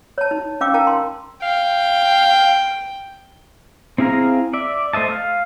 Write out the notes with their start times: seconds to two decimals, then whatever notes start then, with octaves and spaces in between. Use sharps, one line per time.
0.18 C#5 A5
0.31 D#4
0.61 C#4 F5 G5 D6 E6
0.74 D#4 A#4 F5 G5 A5 A#5
0.87 C6
1.43 F5 G5
3.98 C4 E4 G#4 F5 A#5
4.53 D5 E5
4.93 A3 C5 D#5 E5 A5
5.11 F5